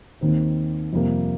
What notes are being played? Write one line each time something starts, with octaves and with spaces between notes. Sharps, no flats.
D#2 D#3 C4
F2 C3 G3 A#3